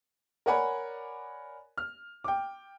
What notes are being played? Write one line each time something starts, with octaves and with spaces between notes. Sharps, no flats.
A#4 C#5 D5 F#5 G#5 B5
F6
G5 D6